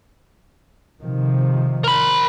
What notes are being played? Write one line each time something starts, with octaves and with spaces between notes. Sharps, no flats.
C3 D#3 F3
A#4 B5